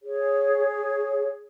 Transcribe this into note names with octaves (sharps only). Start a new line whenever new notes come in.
G#4 C#5